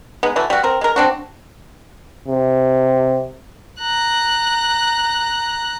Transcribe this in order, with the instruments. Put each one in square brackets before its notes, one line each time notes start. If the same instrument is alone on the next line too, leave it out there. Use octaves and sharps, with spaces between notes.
[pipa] G#3 B3 D#4
E3 F#3 A3
G3 F#4
C4 A#4
G#3 A#4
C4 D4 F#4
[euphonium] C3
[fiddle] A#5 F#6